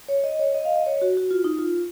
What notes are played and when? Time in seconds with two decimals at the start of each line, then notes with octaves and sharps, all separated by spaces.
0.09 C#5
0.24 D#5
0.39 C#5
0.55 D#5
0.65 F5
0.76 D#5
0.86 C#5
1.02 F#4
1.17 F#4
1.31 F4
1.44 D#4
1.59 F4